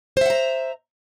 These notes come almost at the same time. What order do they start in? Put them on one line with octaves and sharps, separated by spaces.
C5 E5 F#5 A#5